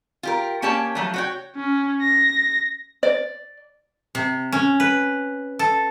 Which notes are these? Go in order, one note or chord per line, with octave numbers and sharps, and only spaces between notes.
F4 G4 A#4
A#3 C#4 G4 C#5 A5
F3 F#3 A3
F#4 C#5 G5
C#4
A#6
D5
C3
C#4
B4
A4